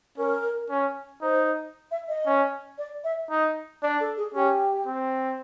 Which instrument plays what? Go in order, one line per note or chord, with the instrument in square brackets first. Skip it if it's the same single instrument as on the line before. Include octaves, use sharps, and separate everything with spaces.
[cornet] C#4 [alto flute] A#4
[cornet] C#4
[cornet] D#4 [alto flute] C5
[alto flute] E5
D#5
[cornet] C#4
[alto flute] D5
E5
[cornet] D#4
[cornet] D4 [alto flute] D5
[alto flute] A4
G#4
[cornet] C#4 [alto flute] G4
[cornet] C4